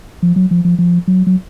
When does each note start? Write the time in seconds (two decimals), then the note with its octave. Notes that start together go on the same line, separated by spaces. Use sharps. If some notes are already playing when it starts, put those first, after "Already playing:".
0.23 F3
0.36 F#3
0.51 F3
0.65 F3
0.79 F3
1.08 F#3
1.27 F#3